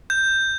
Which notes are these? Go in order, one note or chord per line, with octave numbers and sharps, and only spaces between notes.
G6